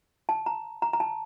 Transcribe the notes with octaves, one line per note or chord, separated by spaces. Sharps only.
A5
A#5
A#5
A#5
A5